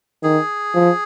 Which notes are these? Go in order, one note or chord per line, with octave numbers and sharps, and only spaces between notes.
D#3 G#4
F3